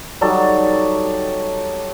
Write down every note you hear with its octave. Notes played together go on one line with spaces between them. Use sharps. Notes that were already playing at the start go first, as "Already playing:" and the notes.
F#3 G3 D#4 A4